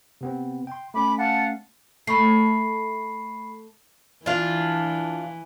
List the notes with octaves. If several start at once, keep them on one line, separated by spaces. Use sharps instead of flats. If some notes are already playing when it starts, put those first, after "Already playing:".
C3 B3 C4
G5 C6
A3 C#4 B5 D6
F5 F#5 A5
A3 B5 C#6 C7
E3 D4 F4